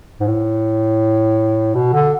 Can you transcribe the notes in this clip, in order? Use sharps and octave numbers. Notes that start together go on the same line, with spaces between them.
G#2
A2
B2
D3